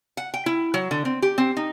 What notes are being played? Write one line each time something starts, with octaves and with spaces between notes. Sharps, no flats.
F#5
G5
E4
F#3
D3
C4
G4
C4
D#4